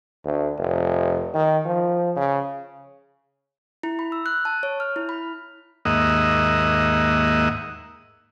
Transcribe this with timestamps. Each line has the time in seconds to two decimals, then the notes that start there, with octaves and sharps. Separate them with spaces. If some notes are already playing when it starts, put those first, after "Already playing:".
0.25 D2
0.59 F1
1.35 D#3
1.66 F3
2.16 C#3
3.83 E4
3.99 B5
4.12 E6
4.26 F#6
4.45 A5
4.63 C#5
4.80 F6
4.96 E4
5.09 B5
5.85 D#2 G#2 A#3 D#5 E5 F#5